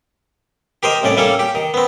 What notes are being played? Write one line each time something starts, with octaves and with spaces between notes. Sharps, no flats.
G4 A#4 C5 D#5
C2 A2 C#4 D5
G3 A#3 C#4 A4
G4
D#3
B3 C4